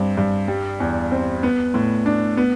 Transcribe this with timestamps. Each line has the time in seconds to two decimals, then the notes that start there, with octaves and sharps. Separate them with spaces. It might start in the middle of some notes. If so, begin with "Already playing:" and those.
Already playing: G2 C4
0.17 G2
0.48 G3
0.80 E2
1.11 C4
1.43 B3
1.74 A2
2.06 D4
2.37 B3